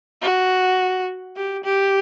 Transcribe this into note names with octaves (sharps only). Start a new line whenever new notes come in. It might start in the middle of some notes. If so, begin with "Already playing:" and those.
F#4
G4
G4